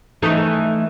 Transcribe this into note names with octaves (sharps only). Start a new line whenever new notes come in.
E3 A3 D#4